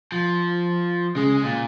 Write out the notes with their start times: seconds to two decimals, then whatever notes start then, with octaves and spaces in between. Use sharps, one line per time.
0.12 F3
1.16 C#3 G#3
1.44 A#2